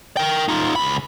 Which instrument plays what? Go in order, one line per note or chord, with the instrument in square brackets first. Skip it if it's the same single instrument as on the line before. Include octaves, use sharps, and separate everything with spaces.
[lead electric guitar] A#4 G5
D#4 F4
C#2 B5